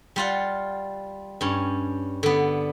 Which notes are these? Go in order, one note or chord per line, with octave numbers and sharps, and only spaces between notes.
G3 F4 F#5
G2 C#4
D3 B3